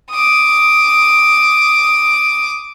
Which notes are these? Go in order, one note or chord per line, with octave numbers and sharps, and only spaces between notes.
D6 D#6